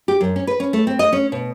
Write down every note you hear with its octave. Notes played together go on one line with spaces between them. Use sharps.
G4
F#2
C#4
B4
C#4
A3
C4
D#5
C#4
B2